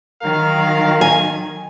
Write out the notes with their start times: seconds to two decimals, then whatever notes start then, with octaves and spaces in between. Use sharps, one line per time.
0.22 D#3 F#3 A#4 F5
1.01 G#5